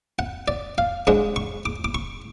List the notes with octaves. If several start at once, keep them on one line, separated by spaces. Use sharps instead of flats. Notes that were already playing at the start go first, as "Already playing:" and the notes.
F#5
D5
F5
G#2 G#3 D4 F#5
C#6
D6
D6
C#6